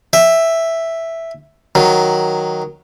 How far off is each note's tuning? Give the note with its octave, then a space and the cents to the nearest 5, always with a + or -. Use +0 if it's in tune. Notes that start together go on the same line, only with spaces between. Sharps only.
E5 +0 G5 +40
D#3 +0 F#3 +0